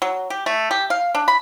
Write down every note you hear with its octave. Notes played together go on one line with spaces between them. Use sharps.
F#3
G4
A3
G4
F5
D4
B5